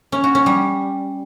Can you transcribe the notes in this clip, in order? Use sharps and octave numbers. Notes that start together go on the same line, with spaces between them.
C#4
F#4
C#4
G3